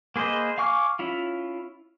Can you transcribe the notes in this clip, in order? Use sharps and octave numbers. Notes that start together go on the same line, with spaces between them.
A#3 G#4 B4 C5 D#5
F5 G#5 C#6 D6 F6
C#4 E4 F4